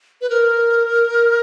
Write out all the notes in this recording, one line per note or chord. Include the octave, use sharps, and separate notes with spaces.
B4
A#4